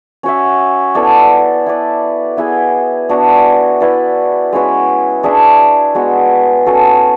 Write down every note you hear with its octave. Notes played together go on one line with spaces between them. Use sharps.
C#4 F#4 C#5 E5
B3 E4 A4 D5
E4 B4 D5
B3 E4 G#4
B3 D4 F#4
E4 B4 D5
G#3 C#4 F#4 B4
D4 G#4 C#5 E5
G#3 B3 F#4
C#4 F#4 A4